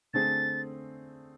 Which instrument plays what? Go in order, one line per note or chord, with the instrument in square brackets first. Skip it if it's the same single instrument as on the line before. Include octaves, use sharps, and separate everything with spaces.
[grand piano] D3 A3 C4 G#4 [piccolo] A6